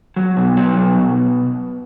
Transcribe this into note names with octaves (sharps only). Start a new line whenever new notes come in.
F#3
B2
F#3
B2
B2